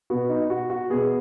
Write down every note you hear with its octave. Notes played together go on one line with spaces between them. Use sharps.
B2 B3 F#4
D#4
F#4
F#4
B2 B3 G#4